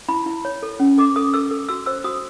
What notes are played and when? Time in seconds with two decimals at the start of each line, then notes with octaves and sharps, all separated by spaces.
0.09 E4 B5
0.26 E4
0.45 C#5
0.63 A4
0.80 C#4
0.98 A4 D6
1.16 A4 D#6
1.34 A4 E6
1.51 A4
1.69 F#4 E6
1.86 C5 E6
2.04 F#4 D#6